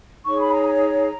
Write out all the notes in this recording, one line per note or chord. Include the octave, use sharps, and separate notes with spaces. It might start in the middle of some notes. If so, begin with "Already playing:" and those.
D#4 G#4 C#5 C#6
B5
A#5
A#5